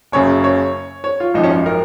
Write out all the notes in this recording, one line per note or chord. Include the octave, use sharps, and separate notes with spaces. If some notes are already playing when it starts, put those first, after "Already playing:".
F#1 F#2 C#3 C#5
C#5
C#5
F4
G#1 F#2 F3 D#4
C#4
D#4
A#4